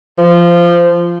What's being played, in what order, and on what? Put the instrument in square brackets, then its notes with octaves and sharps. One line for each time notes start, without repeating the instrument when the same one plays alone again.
[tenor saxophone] F3